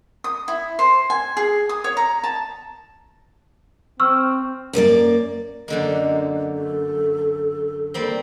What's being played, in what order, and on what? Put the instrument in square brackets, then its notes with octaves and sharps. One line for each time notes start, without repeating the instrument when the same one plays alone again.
[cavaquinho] D#6
E4
C5
G#5
G#4
D#6
C#5
A#5
A5
[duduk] C4 [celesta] C#6 E6 F6
[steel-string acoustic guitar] F#2 A#3 A4 D5
[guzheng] F#2 D3 A#3 [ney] D#5
[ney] A4
[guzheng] G3 A#3 C4